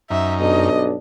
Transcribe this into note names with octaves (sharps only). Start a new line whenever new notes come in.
F#2 D#4 E5
B1 G2 D4 D#5